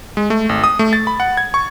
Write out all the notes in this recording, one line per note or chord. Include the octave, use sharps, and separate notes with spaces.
G#3
A3
G#1
D#6
A3
A6
B5
F#5
G#6
C#6